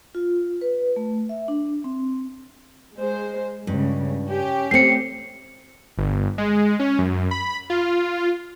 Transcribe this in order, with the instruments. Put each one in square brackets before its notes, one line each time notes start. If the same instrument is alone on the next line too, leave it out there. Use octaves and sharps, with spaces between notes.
[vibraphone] F4
B4
A3
E5
D4
C4
[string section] G#3 C5
[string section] C#2 C#3 [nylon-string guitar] G2
[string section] C#4 G4
[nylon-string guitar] A3 C4 [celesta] C7 C#7
[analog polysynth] G1
G#3
C#4
F#2
B5
F4